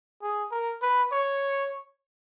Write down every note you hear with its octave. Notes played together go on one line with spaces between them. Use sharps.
G#4
A#4
B4
C#5